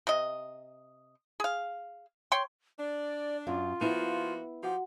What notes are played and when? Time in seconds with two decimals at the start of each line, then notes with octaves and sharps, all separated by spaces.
0.07 C3 D#5
1.40 G#4 F5
2.32 C#5 G5 C6
2.79 D4 D5
3.47 F#2 F4 F5
3.81 F3 A#3 B3 E4 F#4
4.63 F3 F#4 G4 F#5